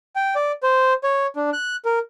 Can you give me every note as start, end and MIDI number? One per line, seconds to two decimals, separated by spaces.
0.16 0.34 79
0.35 0.52 74
0.63 0.93 72
1.04 1.27 73
1.36 1.50 62
1.53 1.76 90
1.85 1.99 70